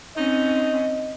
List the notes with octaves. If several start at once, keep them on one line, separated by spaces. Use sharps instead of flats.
C4 C#4 D#4 D#5